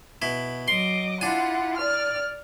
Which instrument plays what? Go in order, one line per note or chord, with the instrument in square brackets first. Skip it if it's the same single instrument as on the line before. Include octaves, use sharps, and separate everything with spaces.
[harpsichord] B2 E4
[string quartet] F#3 D#5 D6 [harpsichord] C6
[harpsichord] D4 G#5 [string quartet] E4 F4 F#5
[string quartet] D5 F6